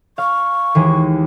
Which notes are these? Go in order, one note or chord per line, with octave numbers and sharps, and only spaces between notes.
F5 C#6
D#2 E3 G#3